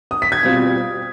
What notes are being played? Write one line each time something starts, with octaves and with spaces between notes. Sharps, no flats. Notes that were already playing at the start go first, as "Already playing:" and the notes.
D#6
B6
G#6
B2 G3 C4 F4